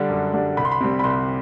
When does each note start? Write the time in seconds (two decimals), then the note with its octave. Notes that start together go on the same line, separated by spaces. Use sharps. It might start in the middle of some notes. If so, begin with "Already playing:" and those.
Already playing: D3 G3 D4
0.10 F#2
0.33 D3 G3 D4
0.57 C2 B5
0.65 C6
0.72 B5
0.81 C3 G3
0.99 B5
1.04 C2 C6